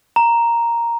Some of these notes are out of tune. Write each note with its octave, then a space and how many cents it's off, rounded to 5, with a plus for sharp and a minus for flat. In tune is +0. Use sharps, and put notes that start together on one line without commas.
A#5 +0